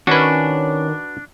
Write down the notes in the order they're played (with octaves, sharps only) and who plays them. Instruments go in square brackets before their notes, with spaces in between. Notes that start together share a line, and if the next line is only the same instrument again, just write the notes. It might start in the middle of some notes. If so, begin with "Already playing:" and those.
[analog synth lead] D#3 [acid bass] C#4 [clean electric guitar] D4 [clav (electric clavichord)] F#4 B4